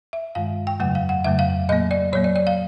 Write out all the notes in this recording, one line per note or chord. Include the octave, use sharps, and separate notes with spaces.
E5
G2 D#3 G#3 F5
G5
F2 C#3 F#3 A3 F#5
F5
F#5
F2 C#3 F#3 A3 E5
F5
A#2 F#3 A#3 D#5
D5
A#2 F#3 A#3 C#5
D5
D5
F5